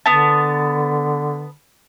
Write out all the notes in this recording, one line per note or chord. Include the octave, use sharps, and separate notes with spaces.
D3 B3 A5